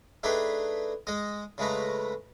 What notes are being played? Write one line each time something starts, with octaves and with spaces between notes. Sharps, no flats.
A3 D4 D#4 G#4 B4 G5
G#3 D#5
C#3 G#3 A3 B4 A#5